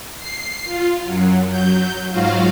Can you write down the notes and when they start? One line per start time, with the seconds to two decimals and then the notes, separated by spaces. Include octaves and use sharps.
0.18 C7
0.64 F4
1.04 F#2 F#3
1.49 F#3 G6
2.10 G#2 F#3 F4 F#4 F5